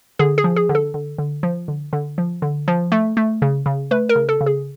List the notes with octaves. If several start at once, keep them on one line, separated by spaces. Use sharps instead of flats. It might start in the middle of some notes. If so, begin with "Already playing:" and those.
D3 G#4
G#4
F3
G#4
D3
A4
D3
D3
F3
D3
D3
F3
D3
F3
A3
A3
C#3
C#3
A3 B4
A#4
C#3
A4
C#3
G#4